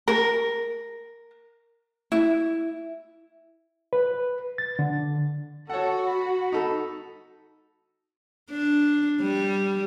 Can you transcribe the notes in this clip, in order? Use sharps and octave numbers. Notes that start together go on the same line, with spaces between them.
A#4
E4
B4
A6
D3
F#4 A4 C#5 F#5
B5
D#4 A4
D4
G3